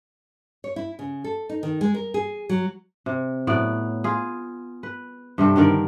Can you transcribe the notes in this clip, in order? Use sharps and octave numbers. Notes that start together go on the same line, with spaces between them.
C#5
E4
C#3
A4
D#4
D#3
G#3
A#4
G#4
F#3
C3
A2 F#3 B3 D5
F4 G#4
B4
G2 C3 G3 A4
D3 D#3 A#4 D5